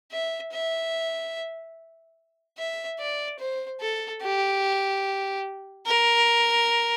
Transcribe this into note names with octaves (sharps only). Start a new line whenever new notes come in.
E5
E5
E5
D5
C5
A4
G4
A#4